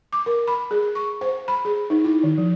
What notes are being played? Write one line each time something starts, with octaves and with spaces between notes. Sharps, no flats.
D6
A#4
B5
G#4
C#6
C5
B5
G#4
D#4
E4
D#3
F3